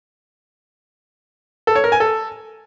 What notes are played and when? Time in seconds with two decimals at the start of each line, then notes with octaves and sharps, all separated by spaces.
1.67 A4
1.76 C#5
1.84 A#4
1.92 G#5
2.00 A4